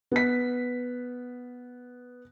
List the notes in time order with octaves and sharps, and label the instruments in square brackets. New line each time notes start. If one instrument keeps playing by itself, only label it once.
[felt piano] B3 B6